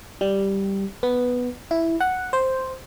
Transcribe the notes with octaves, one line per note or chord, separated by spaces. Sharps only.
G3
B3
E4
F#5
C5